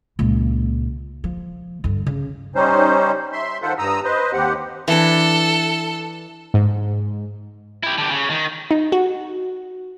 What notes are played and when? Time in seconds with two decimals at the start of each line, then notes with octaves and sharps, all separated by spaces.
0.19 C#2 A#2
1.24 F3
1.84 G2 D3
2.06 C#3
2.55 G3 C#4 D#4 C5
3.32 E5 C6
3.62 D#3 F4 A4 C5 F#5
3.78 G2 A#5 D#6 E6
4.04 B4 C5 D#5
4.33 D#2 C4 G4 F#5
4.88 E3 D4 A4
6.54 G#2
7.83 E4 G4
7.98 D3 G4
8.10 C#3
8.30 D#3
8.71 D#4
8.92 F#4